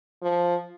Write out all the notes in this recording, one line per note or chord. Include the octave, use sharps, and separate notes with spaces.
F3